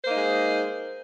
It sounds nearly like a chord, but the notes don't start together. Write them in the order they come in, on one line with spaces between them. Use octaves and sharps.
C5 A#3 D#4 G#3